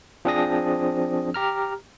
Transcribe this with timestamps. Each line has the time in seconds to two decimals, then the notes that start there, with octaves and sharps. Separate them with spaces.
0.25 F3 C4 D4 G#4 D#6 A#6
1.34 G4 A#5 F6